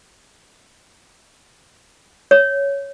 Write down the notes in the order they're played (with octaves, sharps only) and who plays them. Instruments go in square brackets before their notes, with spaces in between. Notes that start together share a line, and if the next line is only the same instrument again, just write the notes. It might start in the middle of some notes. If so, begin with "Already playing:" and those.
[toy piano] C#5